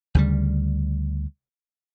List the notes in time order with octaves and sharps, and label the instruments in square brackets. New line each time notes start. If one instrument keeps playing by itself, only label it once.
[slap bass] D2 C#3 G3